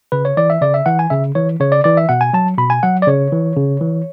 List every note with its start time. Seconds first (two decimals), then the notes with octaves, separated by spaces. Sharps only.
0.12 C#3 B4
0.25 C#5
0.37 E3 D5
0.50 E5
0.61 C#3 D5
0.74 E5
0.86 E3 F#5
0.99 G#5
1.10 C#3 E5
1.35 E3 C#5
1.60 C#3 C#5
1.72 D5
1.84 E3 D5
1.97 E5
2.09 B2 F#5
2.21 G#5
2.33 F#3 A5
2.58 B2 B5
2.70 G#5
2.83 F#3 F#5
3.02 D5
3.07 C#3 C#5
3.32 E3
3.56 C#3
3.81 E3